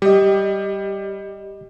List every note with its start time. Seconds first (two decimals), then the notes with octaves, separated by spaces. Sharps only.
0.02 G3 G4 D#5